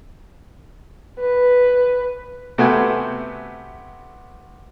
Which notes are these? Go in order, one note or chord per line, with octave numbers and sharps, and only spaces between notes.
B4
C3 A3 B3 F#4 G5 G#5